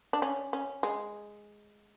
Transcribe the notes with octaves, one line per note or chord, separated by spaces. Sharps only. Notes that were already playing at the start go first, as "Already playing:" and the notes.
D4
C#4
C#4
G#3